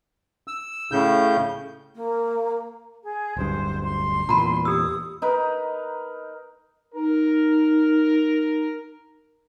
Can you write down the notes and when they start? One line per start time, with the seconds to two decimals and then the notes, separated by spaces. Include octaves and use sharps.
0.48 E6
0.92 A2 C#3 G6
1.95 A#3
3.03 G#4
3.37 D1 G2 C5
3.83 C6
4.29 E2 A#2 A#5 B5
4.65 G4 D#6 E6
5.22 D#4 A#4 B4
6.94 D#4 A#4